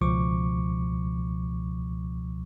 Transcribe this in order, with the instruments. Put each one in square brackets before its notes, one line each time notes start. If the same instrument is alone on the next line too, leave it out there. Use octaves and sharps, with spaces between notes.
[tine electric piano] C#2 B2 F3 C#6 D6